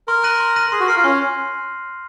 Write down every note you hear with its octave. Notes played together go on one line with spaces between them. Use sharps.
A#4 C6
F#6 A#6 D#7 F#7
C6
F#6 A#6 D#7 F#7
G#4 C6
F#4
A#4 F6 C7
F4
C#4 C6